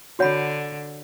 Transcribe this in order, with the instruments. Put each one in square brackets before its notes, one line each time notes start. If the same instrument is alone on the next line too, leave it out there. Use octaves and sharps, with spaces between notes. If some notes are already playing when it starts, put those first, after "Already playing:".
[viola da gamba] D3 [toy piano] F#4 C#5 F#5 B5